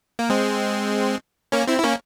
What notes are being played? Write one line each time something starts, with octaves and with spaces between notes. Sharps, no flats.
A#3
G#3 C4
A#3 C#4
C4 E4
E4
A#3 C#4